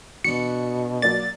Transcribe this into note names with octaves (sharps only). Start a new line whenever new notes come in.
B2 B3 D4 F#4 C#7
F#3 A#3 D5 A6